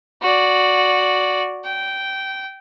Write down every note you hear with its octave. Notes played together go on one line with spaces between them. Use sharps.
F#4 D5
G5